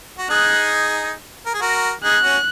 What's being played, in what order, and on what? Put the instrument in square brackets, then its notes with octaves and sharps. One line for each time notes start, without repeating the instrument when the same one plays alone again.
[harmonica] F#4
[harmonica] D#4 G#4 [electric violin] F#6
[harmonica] A#4
G#4
F#4 A#4
[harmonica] D#4 G#4 [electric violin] F#6
[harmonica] C#4 F#4